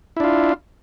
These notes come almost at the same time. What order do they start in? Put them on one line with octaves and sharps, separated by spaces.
E4 D4 F4